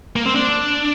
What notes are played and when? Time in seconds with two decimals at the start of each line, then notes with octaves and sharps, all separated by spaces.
0.16 A#3
0.26 C4
0.36 D4